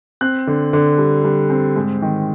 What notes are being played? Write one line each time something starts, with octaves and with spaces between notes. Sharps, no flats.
C4 F#6
D3
D3
G3
G3
C4
G#2
D#3